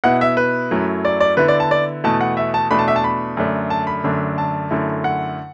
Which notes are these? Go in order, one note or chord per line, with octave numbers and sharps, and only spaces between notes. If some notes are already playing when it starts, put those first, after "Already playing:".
B2 B3 E4 F#5
E5
B4
F#2 F#3 A3 E4
D5
D5
D3 B3 E4 B4
D5
A5
D5
E2 B2 A3 E4 A5
F#5
E5
A5
E2 B2 A3 D4 B5
A5
E5
A5
B5
F#2 D3 A3 D4
A5
B5
F#2 D3 A3 D4
A5
F#2 D3 A3 E4
F#5